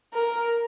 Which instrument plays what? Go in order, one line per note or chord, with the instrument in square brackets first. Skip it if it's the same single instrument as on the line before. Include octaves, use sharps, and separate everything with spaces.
[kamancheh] A#4